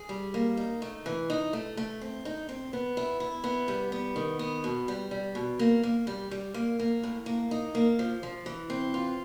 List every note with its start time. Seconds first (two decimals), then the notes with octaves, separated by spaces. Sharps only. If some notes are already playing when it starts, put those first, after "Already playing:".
Already playing: G#4
0.09 G3
0.34 A#3
0.57 D#4
0.82 A3
1.06 E3
1.30 D#4
1.53 A3
1.77 A3
2.01 C4
2.25 D#4
2.49 C4
2.73 B3
2.97 E4
3.20 E4
3.44 B3
3.68 G3
3.92 B3
4.16 D#3
4.39 B3
4.64 B2
4.88 G3
5.11 G3
5.35 B2
5.59 A#3
5.83 A#3
6.07 G3
6.31 G3
6.54 A#3
6.79 A#3
7.03 A2
7.26 A#3
7.51 D#4
7.75 A#3
7.99 F3
8.23 F3
8.46 E3
8.70 C4
8.94 F4